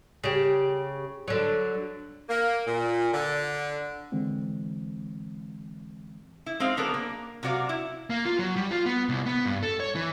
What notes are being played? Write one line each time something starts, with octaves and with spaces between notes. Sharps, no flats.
C#3 G4
D3 F#3
A#3
A#2
D3
D3 E3 G#3 C4
E4
G#3 C4 D#4 F5
D3 F#3 B3 D4 G#4 A#4
A#3
C3 F#3 F#4 D5 F5
E4
A#3
F4
F#3
G3
F4
B3
C2
B3
G2
A4
C#5
E3